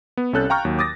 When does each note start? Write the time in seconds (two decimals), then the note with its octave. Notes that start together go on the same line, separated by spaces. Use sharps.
0.17 B3
0.33 C2 C#4 A4 F#6 G6 A6
0.49 F5 G5 A#5 C#6 F6 G6
0.65 D#2 F#3
0.79 D6 D#6 A6 A#6